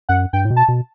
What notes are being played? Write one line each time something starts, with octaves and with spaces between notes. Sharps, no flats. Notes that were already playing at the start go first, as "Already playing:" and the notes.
F#2 F#5
G2 G5
A2
B2
A5
B2